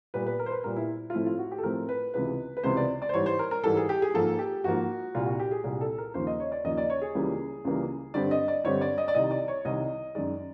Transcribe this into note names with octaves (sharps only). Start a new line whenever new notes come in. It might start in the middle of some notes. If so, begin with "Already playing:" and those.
A#2 G3 B3 B4
B4
A#4
C5
B4
A#2 G3 B3 A#4
E4
F4
A2 F3 A3 C4 E4
F4
F#4
G4
A4
A2 F3 A3 C4 A#4
B4
C#2 C3 E3 G#3 B3 B4
B4
C#2 C3 E3 G#3 B3 C5
D5
D5
C5
G#2 E3 G3 C#5
C5
A#4
A#4
G#2 E3 G3 A4
G#4
G4
G#4
G#2 F3 A#3 A4
G4
G#2 F3 A#3 F#4
C2 A#2 G3 F4
F#4
G4
G#4
C2 A#2 G3 G#4
A4
A#4
D#2 C#3 F3 A#3 C5
D#5
C#5
D5
D#2 C#3 F3 A#3 D#5
D5
C#5
G#4
C#2 C#3 E3 G3 A#3
C#2 C#3 E3 G3 A#3
G2 D3 G3 C4 D5
D#5
D5
G2 D3 G3 C4 C#5
D5
D#5
D5
C2 C3 D#3 D#5
D5
C#5
C2 C3 D#3 D#5
F#2 D#3 G#3 D5